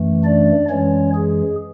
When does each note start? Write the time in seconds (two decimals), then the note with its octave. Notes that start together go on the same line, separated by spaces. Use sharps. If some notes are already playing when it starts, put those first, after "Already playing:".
Already playing: F#2 E3 A3
0.25 D4 D5
0.69 F#2 E3 G#3 C#4 C#5
1.15 G#4